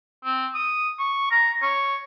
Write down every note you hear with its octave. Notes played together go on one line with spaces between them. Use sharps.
C4
D#6
C#6
A#5
C#5